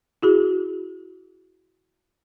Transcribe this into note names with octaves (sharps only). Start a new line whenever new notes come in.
E4 F#4 G#4